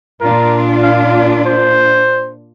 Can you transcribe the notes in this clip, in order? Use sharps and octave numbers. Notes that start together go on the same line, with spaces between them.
A#2 D4 F4 A#4
F5
C5